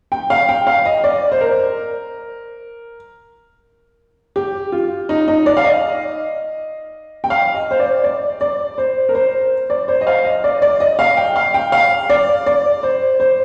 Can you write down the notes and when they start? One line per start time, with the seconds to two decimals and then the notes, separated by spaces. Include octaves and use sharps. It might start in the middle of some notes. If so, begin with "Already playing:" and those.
0.12 G5
0.30 F5
0.49 G5
0.67 F5
0.85 D#5
1.04 D5
1.32 C5
1.41 A#4
4.36 G4
4.72 F4
5.09 D#4
5.28 D#4
5.46 D5
5.57 F5
5.64 D#5
7.24 G5
7.30 F5
7.54 D#5
7.71 C5
7.80 D5
8.04 D5
8.41 D5
8.78 C5
9.09 A#4
9.15 C5
9.70 D5
9.88 C5
10.01 D#5
10.07 F5
10.25 D#5
10.44 D5
10.62 D5
10.80 D#5
10.99 F5
11.17 G5
11.36 F5
11.54 G5
11.72 F5
12.10 D5
12.46 D5
12.83 C5
13.20 C5